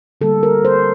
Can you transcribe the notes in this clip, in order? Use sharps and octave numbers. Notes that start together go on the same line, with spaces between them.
D3 G3 A#3 A4
A#4
C5